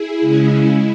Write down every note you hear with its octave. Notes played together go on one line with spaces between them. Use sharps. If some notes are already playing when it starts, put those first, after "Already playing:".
Already playing: E4 G#4
C#3 G#3 C#4
E4